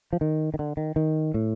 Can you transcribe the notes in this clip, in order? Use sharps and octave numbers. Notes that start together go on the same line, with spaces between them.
F3
D#3
D#3
D3
D#3
D#3
A2